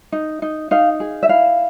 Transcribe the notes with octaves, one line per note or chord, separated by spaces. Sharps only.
D#4
D#4
D#4 F5
G#4
E5
E4 F5